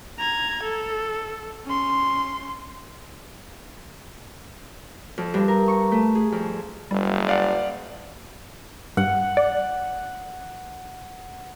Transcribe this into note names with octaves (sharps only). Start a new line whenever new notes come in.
A#5 G#6
A4
C#4 C6
F2
G2
A#4
C#6
A3
G#4
F2
F#1 G3
D5 F5 F#5
G2 F#5
D5